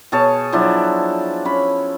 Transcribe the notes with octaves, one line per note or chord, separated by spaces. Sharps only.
B2 G#4 C#5 A5
F3 F#3 D4 E4
C#4 B5